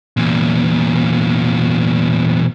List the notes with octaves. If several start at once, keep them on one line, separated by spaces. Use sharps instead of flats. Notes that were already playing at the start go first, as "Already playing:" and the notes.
E2 A#2